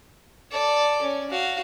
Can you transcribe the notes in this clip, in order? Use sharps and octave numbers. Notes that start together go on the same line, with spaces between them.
A4 D5
C#4
F#4 F5